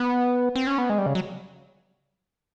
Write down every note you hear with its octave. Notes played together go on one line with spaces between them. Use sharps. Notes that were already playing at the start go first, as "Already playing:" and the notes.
Already playing: B3
C4
C#4
B3
G#3
G3
C#3
F#3